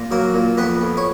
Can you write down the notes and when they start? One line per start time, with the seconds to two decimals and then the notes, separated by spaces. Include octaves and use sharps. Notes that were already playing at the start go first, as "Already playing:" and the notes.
Already playing: A#2
0.11 F#3 A#3 A#4
0.34 A#2
0.57 F2 B3 B4
0.81 F2
0.97 C#5